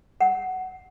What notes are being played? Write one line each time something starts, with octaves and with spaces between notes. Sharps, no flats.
F#5